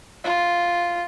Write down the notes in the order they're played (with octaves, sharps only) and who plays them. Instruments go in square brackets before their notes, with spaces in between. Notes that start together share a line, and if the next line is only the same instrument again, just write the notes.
[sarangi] F4